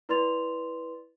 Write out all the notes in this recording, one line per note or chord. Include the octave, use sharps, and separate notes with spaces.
E4 B4 D5 C6 A6 F7